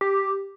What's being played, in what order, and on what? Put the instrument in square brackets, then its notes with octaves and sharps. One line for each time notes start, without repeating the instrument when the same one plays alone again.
[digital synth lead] G4